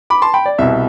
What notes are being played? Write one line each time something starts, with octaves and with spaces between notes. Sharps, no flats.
B5 D6
A5 C6
G5 B5
D5
C2 B2 E5